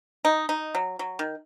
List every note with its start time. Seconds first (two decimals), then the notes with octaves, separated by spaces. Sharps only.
0.25 D#4
0.49 D#4
0.75 F#3
0.99 F#3
1.19 D#3